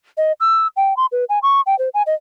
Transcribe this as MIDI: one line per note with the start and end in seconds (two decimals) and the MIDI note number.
0.17 0.32 75
0.40 0.67 88
0.76 0.96 79
0.97 1.06 84
1.12 1.24 71
1.29 1.39 80
1.43 1.61 85
1.66 1.78 79
1.79 1.89 72
1.94 2.03 80
2.06 2.14 75